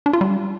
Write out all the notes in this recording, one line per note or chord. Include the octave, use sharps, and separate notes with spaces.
D4
F4
G3